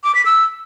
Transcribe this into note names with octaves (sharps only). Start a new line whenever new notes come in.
D6
B6
E6